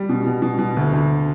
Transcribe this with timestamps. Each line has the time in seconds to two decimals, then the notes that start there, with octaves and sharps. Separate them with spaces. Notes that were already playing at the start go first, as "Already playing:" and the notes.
Already playing: G3
0.09 B2
0.26 B2
0.42 B2
0.59 B2
0.77 D2
0.93 D2